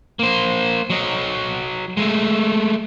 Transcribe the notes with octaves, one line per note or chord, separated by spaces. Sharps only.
A#3 C5
F#3 D#5
G#3 A3